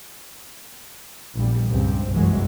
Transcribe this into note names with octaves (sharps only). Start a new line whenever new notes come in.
A#1 E2 G3
C#2 G2 C4
G1 C2 F#2 E3 F#3 G#3